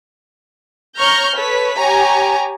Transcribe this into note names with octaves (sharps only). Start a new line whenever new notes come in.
C#5 A#5 C#6 F6 G6 A#6
A4 B4 C#5 B6
G4 C#5 G#5 A#5